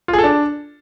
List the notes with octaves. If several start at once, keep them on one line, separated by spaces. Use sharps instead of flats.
F4
G#4
A4
D4